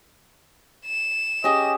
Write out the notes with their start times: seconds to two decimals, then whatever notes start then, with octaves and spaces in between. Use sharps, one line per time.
0.86 E7
1.44 C#4 G4 G#4 D#5